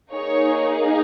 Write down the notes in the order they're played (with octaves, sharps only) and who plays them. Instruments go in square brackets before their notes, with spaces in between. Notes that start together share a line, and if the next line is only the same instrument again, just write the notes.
[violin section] A#3 D#4 G#4 C#5